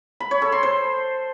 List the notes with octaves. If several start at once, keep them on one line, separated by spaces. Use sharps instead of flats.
B5
C#5
A4
C6
C5